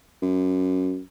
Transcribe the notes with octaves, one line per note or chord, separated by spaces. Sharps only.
F#2